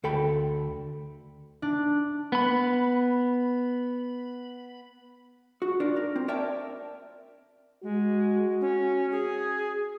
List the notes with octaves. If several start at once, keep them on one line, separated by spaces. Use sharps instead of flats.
D2 A4 G5 B5
D4
B3 B5
F#4
D4 F4 A#4 D5
A#4
C4
A#4 C#5 D5 E5 G5 A5
G#3 F#4
C#4
G#4